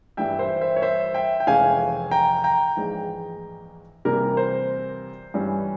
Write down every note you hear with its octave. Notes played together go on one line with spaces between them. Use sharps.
G2 E3 G3 E5 G5
C5 E5
C5 E5
C#5
C5 E5
E5 G5
G5
F1 F2 E3 G#3 C#4 F5 G#5
G5 A#5
G5 A#5
A#1 G#2 E3 G#3
C3 E3 G3 A#3 A#4
C5
G2 E3 G3 C#4